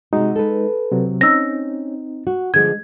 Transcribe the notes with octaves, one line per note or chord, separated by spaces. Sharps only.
C3 G#3 D#4 F#4
A4 B4
C3 F#3
C4 C#4 D#4 E6 A#6
F#4
D3 F3 G#3 G#6